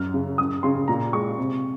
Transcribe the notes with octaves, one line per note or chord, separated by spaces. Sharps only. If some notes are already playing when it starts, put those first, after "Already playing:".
Already playing: F#2 F#3 F6
C#3
F#2 D#6
C#3 C6
A#2 A#5
G#3 C#6
C3